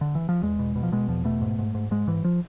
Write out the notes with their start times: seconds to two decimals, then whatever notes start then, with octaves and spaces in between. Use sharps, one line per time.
0.01 D3
0.15 E3
0.29 F3
0.43 E2 G#3
0.59 B2
0.76 B2
0.83 F3
0.92 B2 G#3
1.08 E2 F3
1.25 B2 A3
1.41 G#2
1.59 G#2
1.75 G#2
1.91 G#2 G#3
2.07 G#2 E3
2.24 F3